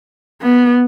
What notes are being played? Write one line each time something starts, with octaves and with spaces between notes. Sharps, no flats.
B3